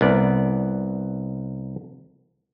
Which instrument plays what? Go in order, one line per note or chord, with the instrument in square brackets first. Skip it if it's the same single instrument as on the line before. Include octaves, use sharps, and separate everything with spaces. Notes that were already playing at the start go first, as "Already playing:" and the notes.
[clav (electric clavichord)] C2 B3 D5